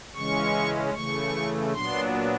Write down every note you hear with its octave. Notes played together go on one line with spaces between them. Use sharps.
C#3 E3 G#3 C#4 C#6
C#3 E3 A3 C#6
A#2 F#3 B3 D4 C6